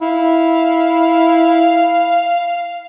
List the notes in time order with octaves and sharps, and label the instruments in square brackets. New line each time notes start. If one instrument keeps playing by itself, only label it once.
[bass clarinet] E4 [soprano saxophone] F5